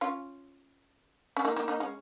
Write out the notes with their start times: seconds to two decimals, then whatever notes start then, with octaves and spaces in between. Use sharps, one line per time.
0.01 C#4 F4
1.37 C#4
1.45 A#3 D#4
1.56 A#3 D#4
1.68 A#3 D#4
1.80 G#3 C#4